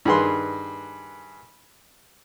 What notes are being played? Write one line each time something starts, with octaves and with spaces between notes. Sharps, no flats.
G2 D#3 G#4 B4 C6